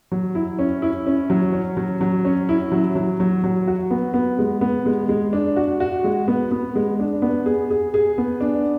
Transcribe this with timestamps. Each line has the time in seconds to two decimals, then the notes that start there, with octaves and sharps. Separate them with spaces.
0.12 F#3
0.35 E4
0.59 C#4
0.82 E4
1.06 C#4
1.30 F#3
1.53 C#4
1.77 F#3
2.01 F#3
2.25 C#4
2.49 E4
2.72 F#3
2.95 F#3
3.20 F#3
3.44 F#3
3.67 F#4
3.91 B3
4.14 B3
4.39 G#3
4.61 B3
4.86 G#3
5.09 G#3
5.33 D4
5.56 F#4
5.80 F#4
6.04 G#3
6.28 B3
6.51 B3
6.75 G#3
6.99 D4
7.22 B3
7.46 G#4
7.70 G#4
7.94 G#4
8.18 B3
8.41 D4